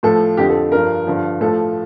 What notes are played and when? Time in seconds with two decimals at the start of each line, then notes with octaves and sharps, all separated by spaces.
0.03 A2 F3 A4
0.37 F2 D3 F3 G4
0.49 A4
0.72 G2 F3 A#4
1.07 G2 D3 F3
1.41 A2 F3 A4